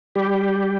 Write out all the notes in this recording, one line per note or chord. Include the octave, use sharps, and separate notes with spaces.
G3 G4